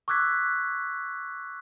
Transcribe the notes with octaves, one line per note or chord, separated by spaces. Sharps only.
C#6 D6 E6 F#6 G#6 B6